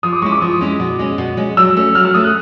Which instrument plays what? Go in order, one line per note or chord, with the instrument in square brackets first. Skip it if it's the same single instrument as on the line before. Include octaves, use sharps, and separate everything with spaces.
[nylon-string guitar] F3 [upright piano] D#6
[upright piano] D6
[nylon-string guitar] G#3 C#4 E4 [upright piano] C#6
[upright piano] D6
[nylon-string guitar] F3 [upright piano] D#6
[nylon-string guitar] G#3 C#4 E4
B2
G#3 C#4
B2
G#3 C#4
[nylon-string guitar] F#3 [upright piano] E6
[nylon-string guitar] A3 C#4
[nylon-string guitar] F#3 [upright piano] F6
[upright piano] E6
[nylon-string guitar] A3 C#4 [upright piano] D#6
[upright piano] F#6